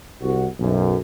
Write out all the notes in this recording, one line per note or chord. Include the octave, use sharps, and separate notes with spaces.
C2 F#4
B1 F#2